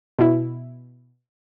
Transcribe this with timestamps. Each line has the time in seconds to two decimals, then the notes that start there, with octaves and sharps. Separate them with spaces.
0.19 B2 E4